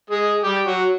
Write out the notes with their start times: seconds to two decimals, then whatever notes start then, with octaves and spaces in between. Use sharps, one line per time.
0.10 G#3 G#4
0.44 G3 G4
0.67 F#3 F#4